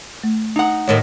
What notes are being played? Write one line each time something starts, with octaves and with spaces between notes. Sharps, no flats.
A3
D#4 F#5
D#2 A2 D#3 C#5